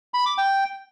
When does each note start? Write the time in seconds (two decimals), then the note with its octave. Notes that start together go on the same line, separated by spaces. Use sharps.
0.14 B5
0.26 D6
0.38 G5